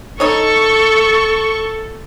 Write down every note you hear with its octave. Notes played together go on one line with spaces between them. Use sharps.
D#4 A4 C#5 C#6